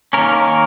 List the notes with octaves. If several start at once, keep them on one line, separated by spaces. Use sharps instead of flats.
D#3 A#3 C#4 A#4